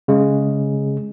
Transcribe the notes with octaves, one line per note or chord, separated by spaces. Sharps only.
C#3 G#3